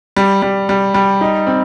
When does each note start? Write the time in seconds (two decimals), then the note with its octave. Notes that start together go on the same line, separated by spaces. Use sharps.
0.17 G3
0.42 G3
0.69 G3
0.94 G3
1.21 D#4
1.47 C4